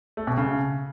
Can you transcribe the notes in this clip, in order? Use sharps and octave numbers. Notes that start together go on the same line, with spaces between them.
A3
B2
C#3